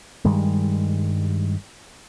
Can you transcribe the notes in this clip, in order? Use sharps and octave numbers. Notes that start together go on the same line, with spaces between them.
G2 D#3 G3 G#3